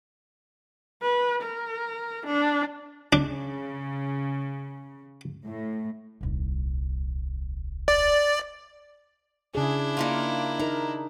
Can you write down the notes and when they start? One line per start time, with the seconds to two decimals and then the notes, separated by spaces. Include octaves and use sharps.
1.02 B4
1.42 A#4
2.26 D4
3.13 C#3 D4
5.46 A2
6.21 D#1 C2
7.88 D5
9.55 C#3 D4 E4 G#4
9.97 A#3 D#4 F4
10.59 D#4 A#4 A#5